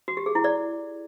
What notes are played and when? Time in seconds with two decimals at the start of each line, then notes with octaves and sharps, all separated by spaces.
0.08 F#4
0.17 G4
0.26 G#4
0.35 E4
0.44 D5